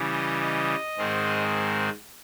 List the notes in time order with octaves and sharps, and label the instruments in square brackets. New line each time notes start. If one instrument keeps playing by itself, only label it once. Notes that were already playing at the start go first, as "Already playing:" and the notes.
Already playing: [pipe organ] C#3 E3 G3
D#5
D#5
G#2 D#3 G#3 C4